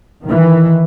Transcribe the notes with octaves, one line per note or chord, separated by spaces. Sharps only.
D#3 E3